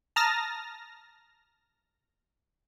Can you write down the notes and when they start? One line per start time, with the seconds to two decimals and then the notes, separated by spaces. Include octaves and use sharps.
0.16 A5 A#5 D#6 F6 A6 A#6